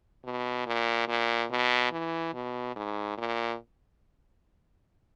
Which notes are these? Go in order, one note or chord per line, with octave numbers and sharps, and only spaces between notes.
B2
A#2
A#2
B2
E3
B2
G#2
A#2